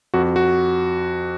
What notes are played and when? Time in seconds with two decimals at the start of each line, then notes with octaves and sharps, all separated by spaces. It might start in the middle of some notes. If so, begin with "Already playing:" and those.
0.14 F2 F#4
0.36 F#4